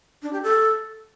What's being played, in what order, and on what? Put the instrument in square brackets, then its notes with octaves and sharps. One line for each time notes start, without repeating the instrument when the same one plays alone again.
[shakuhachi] D4
G4
A4